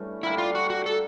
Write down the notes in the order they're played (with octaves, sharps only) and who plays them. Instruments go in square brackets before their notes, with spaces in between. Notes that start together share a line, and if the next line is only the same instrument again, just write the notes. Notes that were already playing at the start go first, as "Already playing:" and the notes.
Already playing: [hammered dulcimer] G2 E3 A3 C#4
[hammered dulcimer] D3 G3 A#3 D4 [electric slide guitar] E4
[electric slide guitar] F4
F#4
F#4
A4